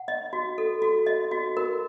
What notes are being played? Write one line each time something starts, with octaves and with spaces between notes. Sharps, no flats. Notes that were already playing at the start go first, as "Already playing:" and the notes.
Already playing: F#5
D#5
F#4
A4
F#4
D#5
F#4
A#4